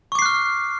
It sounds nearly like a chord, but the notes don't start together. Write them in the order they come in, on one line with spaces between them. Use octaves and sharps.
C#6 D6 C7 F#6 F6